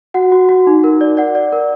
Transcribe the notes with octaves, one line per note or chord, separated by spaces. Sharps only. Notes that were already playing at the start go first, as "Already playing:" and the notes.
F#4 F#5
F#4
F#4
D#4
A#4
D5
D5 F#5
D5
A#4